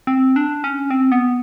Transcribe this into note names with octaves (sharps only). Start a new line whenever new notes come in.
C4
D4
C#4
C4
B3